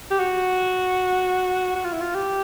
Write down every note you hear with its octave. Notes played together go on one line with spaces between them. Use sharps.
G4
F#4
F#4
F4
E4
F4
G4